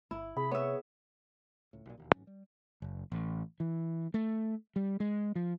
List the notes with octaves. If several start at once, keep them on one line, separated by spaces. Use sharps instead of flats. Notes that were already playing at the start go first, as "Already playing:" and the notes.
G1 E4
C3 G#4 B5
B3 C#5 E5
C#2 A2
B1 A#2
E1 D#2
A1 G#2 F#3 C#4
G3
F#1
A1
E3
A3
G3
G#3
F3